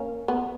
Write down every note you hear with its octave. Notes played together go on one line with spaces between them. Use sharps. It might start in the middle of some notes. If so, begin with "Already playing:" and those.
Already playing: A#3 C#4
B3